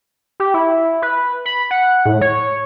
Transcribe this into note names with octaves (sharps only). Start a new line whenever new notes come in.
G4
E4
B4
B5
F#5
A2
C#5